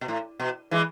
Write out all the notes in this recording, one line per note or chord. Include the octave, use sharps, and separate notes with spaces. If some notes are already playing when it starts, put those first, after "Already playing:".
B2
A2
B2
E3 G#3